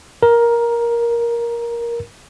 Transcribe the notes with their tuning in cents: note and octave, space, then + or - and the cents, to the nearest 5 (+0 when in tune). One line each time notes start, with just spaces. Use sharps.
A#4 +10